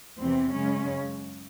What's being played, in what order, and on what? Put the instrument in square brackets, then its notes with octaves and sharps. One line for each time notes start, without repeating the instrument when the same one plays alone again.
[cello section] E2 C3 E3 C4
F#2 C#3 G#3 C#4